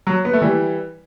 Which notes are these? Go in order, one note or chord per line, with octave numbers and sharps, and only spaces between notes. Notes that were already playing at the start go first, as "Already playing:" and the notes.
F#3
B3
A3
E3 G3